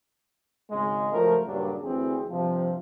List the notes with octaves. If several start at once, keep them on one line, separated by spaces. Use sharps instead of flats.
G#1 C#3 G#3
C#2 F3 F#3 A3 A#4
G2 A#2 C#3 F#3 D4
D2 E3 C4 G#4
G2 C3 F3